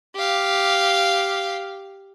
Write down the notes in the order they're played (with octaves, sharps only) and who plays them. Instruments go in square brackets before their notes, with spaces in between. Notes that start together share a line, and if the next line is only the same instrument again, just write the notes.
[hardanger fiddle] G4 F5